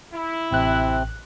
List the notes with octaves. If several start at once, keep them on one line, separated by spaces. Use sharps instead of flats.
E4
A1 C3 C4 F#6